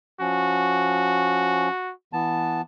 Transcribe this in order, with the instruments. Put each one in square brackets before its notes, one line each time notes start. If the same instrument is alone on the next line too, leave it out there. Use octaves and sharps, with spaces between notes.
[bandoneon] F3 C#4 [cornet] F#4
[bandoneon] E3 B3 A5